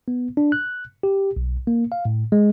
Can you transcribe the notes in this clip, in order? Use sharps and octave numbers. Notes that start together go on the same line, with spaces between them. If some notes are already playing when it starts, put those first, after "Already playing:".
B3
D4
F#6
G4
B1
A#3
F5
A2
G#3